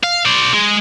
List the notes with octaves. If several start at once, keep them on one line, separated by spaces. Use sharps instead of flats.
F5
C5 D5
G#3